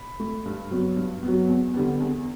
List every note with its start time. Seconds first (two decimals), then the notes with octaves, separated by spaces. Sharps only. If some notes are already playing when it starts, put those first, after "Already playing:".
Already playing: B5
0.20 A3
0.45 G2
0.71 F#3 B3
0.96 G2
1.23 F#3 B3
1.49 E2
1.74 D3 G3 B3
2.00 E2